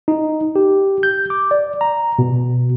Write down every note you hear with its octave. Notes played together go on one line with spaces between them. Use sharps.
D#4
G4
G6
D6
D5
A#5
B2